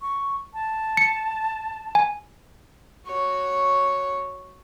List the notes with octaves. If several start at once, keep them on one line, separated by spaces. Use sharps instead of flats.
C#6
A5
C#7
G#5
F#4 C#5